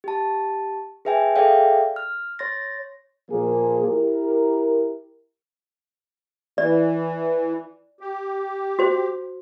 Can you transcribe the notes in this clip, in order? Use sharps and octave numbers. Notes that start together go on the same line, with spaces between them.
G4 A5
G#4 B4 E5 G5 G#5
G#4 A4 D5 E5 F5 G5
F6
C#5 C6 A6 A#6
A#2 F3 A#3 G#4
E4 G4 A#4
E3 D5
G4
F#4 C5